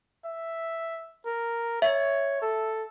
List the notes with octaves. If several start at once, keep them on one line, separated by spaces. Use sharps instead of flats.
E5
A#4
C#5 E5
A4